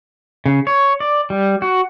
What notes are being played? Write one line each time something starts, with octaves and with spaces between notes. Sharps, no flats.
C#3
C#5
D5
G3
F#4